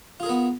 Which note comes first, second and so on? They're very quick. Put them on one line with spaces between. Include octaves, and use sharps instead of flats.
F4 G#4 A#4 B3